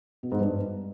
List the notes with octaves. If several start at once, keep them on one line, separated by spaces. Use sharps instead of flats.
B2
G#2
G2